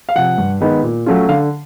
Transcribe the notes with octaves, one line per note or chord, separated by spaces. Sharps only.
F5
C3 F3 F#5
G2
D#3 G#3 B3 D#4
A#2
F#3 A3 C#4 F4
D3 F5